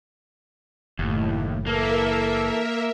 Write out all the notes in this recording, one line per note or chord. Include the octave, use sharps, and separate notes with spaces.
F#1 D#2 A2
E3 A#3 A4 A#4 E5